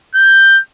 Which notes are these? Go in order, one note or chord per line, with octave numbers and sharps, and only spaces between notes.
G6